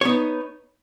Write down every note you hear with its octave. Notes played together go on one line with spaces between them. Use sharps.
B3 D#4 C#5